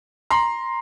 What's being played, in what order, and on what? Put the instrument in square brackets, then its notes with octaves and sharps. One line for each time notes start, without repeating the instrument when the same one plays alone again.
[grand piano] A#5 C6